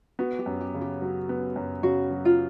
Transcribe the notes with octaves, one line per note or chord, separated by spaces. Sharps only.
B3 F#4
G4
F#2
G4
C#3
G4
F#3
B3
F#2
C#3 F#4
F#3
F4